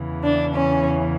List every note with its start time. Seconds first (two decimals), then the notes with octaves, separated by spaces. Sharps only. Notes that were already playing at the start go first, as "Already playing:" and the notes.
Already playing: E2 C#3 E3
0.23 D4
0.54 C#4